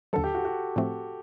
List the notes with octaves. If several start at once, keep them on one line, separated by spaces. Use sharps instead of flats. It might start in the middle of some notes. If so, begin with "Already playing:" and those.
D#2 D3 F#3 A4
G4
F#4
F#4
A2 F3 A3 C4